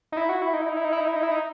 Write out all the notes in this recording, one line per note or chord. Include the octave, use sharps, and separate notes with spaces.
D#4
E4
F#4
E4
D#4
E4
D#4
E4
D#4
E4
D#4
E4
D#4
E4
D#4